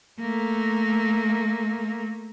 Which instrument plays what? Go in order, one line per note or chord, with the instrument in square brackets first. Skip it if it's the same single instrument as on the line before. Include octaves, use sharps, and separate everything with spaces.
[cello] A3 A#3